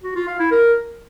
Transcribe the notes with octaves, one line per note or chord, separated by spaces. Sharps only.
F#4
F4
F5
E4
A#4